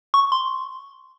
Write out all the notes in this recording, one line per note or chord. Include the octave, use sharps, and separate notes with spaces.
C#6
C6